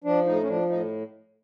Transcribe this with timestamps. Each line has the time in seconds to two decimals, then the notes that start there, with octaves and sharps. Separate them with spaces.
0.04 F3 D4
0.26 A2 D#4
0.42 C#4
0.48 F3 D4
0.70 A2 D#4